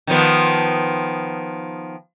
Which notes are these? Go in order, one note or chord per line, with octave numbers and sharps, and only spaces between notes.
D#3 F3 B3